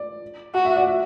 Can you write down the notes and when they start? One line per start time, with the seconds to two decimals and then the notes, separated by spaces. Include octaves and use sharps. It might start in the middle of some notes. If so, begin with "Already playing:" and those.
Already playing: D5
0.55 F#4 F#5
0.65 E5
0.76 D5
0.87 E5